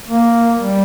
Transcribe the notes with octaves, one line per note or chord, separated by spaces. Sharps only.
A#3
G3